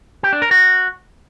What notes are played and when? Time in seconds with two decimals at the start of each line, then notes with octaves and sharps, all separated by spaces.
0.23 G4
0.33 D4
0.42 A#4
0.51 F#4